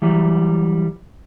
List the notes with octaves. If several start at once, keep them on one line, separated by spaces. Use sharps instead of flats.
E3 F#3 G3